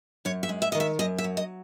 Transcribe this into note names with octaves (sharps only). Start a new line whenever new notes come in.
F#2 C#5
E5
G#3
E5
D#5
D#3
E5
F#2 D#5
E5
F#3
D#5